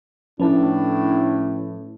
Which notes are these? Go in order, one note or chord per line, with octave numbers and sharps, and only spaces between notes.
A2 F3 C#4 D4 E4 B4 A5